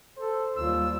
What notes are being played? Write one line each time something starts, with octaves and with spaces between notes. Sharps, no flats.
A4 C5
D#2 G3 F4 E6